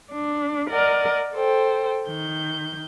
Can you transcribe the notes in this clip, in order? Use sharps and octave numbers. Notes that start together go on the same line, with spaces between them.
D4
A#4 D5 D#5 F#5
A4 C5 G5
D#3 G6